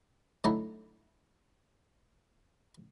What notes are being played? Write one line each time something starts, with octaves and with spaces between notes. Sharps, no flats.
D3 F#3 A3 D#4 E4